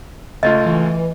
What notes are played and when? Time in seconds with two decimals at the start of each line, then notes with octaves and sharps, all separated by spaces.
0.43 C#2 A3 F4 D#5
0.66 E3